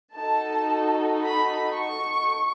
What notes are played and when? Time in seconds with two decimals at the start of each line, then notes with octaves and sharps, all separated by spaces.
0.14 D#4 F#4 A4 A5
1.22 B5
1.75 C#6